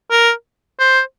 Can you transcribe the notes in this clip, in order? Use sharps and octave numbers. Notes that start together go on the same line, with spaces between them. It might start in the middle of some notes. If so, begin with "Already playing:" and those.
A#4
C5